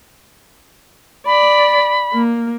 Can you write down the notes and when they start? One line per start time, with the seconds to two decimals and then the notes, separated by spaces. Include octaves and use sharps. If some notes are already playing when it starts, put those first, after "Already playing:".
1.26 D5 B5
2.14 A#3